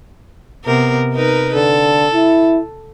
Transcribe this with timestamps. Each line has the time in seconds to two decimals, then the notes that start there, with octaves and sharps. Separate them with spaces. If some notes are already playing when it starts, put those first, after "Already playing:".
0.65 C3 B3 A#4
1.13 D#4 A#4 B4
1.54 D3 A4
2.14 E4